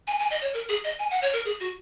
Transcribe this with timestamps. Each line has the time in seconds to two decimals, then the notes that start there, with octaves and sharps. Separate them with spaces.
0.07 G#5
0.19 G#5
0.31 D#5
0.42 C#5
0.54 A#4
0.69 G#4
0.84 D#5
0.99 G#5
1.11 F#5
1.22 C#5
1.33 A#4
1.45 G#4
1.60 F#4